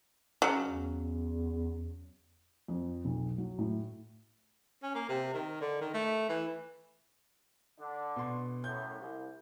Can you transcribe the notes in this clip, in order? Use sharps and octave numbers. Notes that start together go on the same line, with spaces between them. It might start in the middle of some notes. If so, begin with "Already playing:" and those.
C#3 F#3
E2
F2
B1
F#3
A2
C#4
A#3
C3
D#3
D3
D#3
A3
E3
D3 D4
B2 C6
F#2 A2 G6
C2